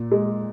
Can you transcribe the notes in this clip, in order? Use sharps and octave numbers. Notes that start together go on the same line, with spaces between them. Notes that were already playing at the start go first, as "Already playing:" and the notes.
Already playing: A#2
G#3